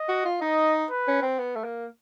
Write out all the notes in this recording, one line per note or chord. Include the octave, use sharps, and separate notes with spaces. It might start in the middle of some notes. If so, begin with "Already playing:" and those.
Already playing: D#5
F#4
F4
D#4 D#5
B4
C#4
C4
B3
A3
A#3